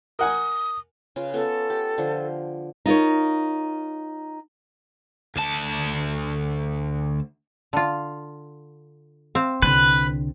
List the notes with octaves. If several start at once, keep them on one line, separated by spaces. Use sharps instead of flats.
A#4 F#5 G#5 D#6
C#3 F4 B4
B3 C#4 F4 A4
G4
D3 F3
D#4 F4 A#4 C#5
D2 A5
D3 F4
C4 F5
C2 D3 B4